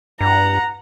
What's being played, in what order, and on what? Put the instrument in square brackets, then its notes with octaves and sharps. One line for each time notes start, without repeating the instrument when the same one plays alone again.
[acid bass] G2 [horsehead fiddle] F#5 A#5